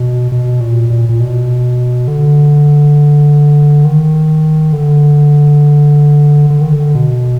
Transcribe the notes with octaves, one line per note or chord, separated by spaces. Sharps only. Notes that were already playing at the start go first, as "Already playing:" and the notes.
Already playing: B2
B2
A#2
A#2
A#2
B2
D3
D#3
D3
D3
D#3
D3
B2